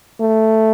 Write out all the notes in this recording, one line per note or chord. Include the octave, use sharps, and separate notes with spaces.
A3